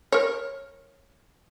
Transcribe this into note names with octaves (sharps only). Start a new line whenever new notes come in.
A#4 C#5